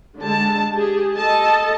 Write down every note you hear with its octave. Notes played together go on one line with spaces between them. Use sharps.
D3 G#3 A5
G4 G#4
A4 D#5 A5